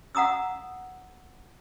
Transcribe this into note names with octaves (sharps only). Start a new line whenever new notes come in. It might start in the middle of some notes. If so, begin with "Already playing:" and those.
F5 F#5 A#5 D#6 E6